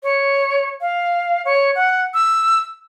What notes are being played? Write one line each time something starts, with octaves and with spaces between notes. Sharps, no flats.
C#5
F5
C#5
F#5
E6